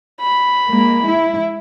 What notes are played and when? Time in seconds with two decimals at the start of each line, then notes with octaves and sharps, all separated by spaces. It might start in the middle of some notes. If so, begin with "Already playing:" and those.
0.21 B5
0.67 G#3 A#3
1.05 E4